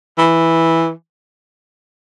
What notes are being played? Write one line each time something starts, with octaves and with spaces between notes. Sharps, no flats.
E3